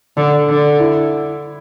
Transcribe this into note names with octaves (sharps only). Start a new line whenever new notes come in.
D3 D4
D3
E4